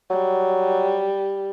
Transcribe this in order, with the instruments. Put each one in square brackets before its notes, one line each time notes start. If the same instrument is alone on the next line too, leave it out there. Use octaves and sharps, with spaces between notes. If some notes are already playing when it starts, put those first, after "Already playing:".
[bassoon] F#3 [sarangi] G3